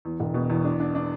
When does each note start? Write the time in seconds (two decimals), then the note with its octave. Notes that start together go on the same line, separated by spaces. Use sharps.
0.05 E2
0.20 E1
0.34 B2
0.50 E2
0.65 D4
0.80 D4
0.95 D4